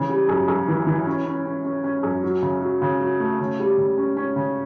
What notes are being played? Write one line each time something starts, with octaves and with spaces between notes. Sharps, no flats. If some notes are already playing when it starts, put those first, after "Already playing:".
Already playing: C#3 E3
G3
F#2
F#2
E3
E3
C#4
C#4
C#4
C#4
C#4
F#2
F#3
C#3
F#3
C#3
F#3
A3
C#3
G3
C#3
C#4
C#4
C#3